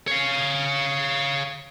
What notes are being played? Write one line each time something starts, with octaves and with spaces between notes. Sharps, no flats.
C#5 F5